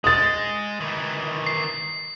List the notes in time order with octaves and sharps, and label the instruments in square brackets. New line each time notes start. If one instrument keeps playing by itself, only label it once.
[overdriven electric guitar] G#3 [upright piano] D#6 A6
[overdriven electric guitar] D#3 E3
[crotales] C7